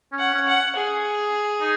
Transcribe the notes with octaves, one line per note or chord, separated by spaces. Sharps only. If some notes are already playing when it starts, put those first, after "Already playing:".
C#4
F#5
C#4
F#5
G#4
D#4